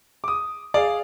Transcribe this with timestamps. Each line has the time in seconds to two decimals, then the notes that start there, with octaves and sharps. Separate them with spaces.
0.24 D6 D#6
0.74 G#4 D5 F5